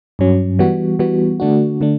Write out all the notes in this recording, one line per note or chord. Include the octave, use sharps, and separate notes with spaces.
G2 F#3 C#4
E3 G3 B3 F#4
E3 G3 B3 F#4
D3 A3 D4 F#4
D3 A3 D4